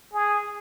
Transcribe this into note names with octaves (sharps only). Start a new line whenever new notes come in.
G#4